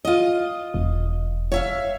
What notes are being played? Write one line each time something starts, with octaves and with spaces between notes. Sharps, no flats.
F4 D#5
E1
C#5 E5 F5